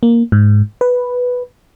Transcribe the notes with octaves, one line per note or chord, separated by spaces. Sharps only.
A#3
G#2
B4